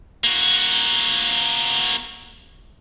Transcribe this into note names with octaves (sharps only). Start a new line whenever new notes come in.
A#3 F#4